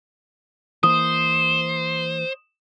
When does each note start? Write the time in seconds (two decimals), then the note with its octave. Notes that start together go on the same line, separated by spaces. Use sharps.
0.83 E3 A#3 C5 D#6